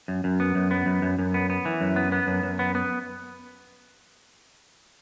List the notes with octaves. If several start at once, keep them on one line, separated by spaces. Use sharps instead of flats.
F#2
F#2
B3
F#2
B3
F#2
F#2
F#2
B3
B3
E3
F#2
B3
B3
F#2
F#2
B3
B3